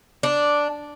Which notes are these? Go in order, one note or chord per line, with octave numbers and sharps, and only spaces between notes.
D4